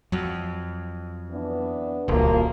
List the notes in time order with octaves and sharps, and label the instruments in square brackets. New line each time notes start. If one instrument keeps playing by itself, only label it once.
[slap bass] F2 [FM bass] F#3
[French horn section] E3 B3 D4
[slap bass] D#1 [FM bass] C#2 [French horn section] F3 F#3 A#3